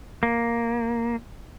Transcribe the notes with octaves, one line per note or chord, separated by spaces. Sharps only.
A#3